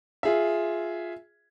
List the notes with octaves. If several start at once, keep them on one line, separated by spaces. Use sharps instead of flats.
F4 G#4 E5